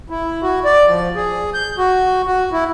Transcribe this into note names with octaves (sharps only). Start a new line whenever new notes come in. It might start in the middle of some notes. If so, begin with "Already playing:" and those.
E4
F#4
D5
F3
G#4
G6
F#4
F#4
E4